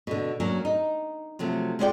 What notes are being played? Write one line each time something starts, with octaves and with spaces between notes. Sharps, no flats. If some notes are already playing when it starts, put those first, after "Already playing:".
B2 D3
F#3 A#3 C#4 D4
D#4
C3 F3 F#3 A3
G#3 E4 F4 B4 D5 G5